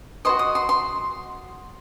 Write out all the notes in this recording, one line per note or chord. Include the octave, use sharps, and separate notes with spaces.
F#4 C5 D#5 C6
D#6
C6
C6